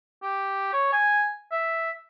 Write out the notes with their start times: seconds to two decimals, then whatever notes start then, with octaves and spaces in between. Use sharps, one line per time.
0.23 G4
0.73 C#5
0.93 G#5
1.52 E5